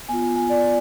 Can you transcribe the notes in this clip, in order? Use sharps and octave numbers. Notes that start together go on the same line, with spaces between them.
B3 F4 G#5
G#5
G#5
D5